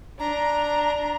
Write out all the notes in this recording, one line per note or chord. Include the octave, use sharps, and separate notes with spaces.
D4 A#5